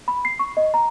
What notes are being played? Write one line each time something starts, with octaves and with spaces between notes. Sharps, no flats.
B5
C7
C#6
D#5
A#5